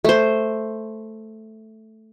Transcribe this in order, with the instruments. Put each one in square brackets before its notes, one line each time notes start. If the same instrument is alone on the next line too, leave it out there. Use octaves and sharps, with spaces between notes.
[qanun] A3 C5